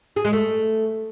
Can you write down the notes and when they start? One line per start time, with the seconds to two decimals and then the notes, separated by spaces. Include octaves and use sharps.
0.16 G#4
0.25 G#3
0.33 A3